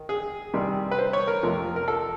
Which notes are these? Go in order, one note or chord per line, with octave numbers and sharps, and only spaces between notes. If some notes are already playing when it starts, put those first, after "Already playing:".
Already playing: D#3
G#4
C3 D#3 G3
B4
C5
C#5
A#4
F2 C3 F3 A3
A#4
A4